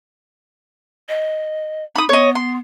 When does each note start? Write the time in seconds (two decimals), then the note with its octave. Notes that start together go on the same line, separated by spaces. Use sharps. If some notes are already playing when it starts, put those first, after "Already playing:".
1.09 D#5
1.96 D#4 B5 D#6
2.09 B3 C#5 D#5
2.35 C6